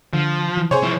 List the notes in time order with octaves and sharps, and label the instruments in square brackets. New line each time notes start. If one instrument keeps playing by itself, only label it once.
[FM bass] D3 [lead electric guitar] F3
[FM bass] E3
[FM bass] C3 [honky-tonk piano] G#4 C5 C#5
[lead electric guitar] F3 E4